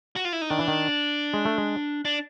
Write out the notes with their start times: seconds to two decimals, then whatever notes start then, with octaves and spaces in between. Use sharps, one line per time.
0.16 F#4
0.25 F4
0.33 E4
0.42 D#4
0.50 D#3 D4
0.59 E3
0.68 D#3
1.34 G#3
1.45 A3
1.58 G#3
2.05 D4